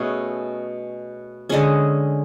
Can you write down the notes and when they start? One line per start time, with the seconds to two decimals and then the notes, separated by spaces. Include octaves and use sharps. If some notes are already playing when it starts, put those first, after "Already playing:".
Already playing: B2 A3 C#4 F#4 G#4
1.49 D3 G#3 C#4 G#4